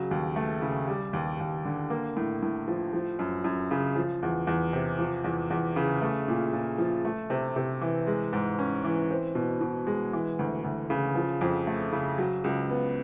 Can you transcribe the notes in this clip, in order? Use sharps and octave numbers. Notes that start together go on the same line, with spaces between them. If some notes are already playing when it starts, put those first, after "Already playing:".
Already playing: C#3 F#3
D#2
A3
C#3
G3
D#2
D#2
D3
A#3
A2
A2
F3
F3
F#2
F#2
C#3
F3
E2
E2
C3
F3
E2
E2
C#3
A3
A#2
A#2
F3
A3
C3
C3
E3
G#3
G#2
C#4
E3
C4
B2
B2
G#3
E3
D2
D2
C#3
F3
F2
A3
C#3
F#3
C#2
B3